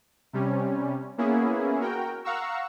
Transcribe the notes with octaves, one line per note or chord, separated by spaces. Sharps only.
C3 G3 C#4
A#3 B3 C#4 E4 G#4
F#4 A#4 G5
F5 F#5 A#5 C#6 E6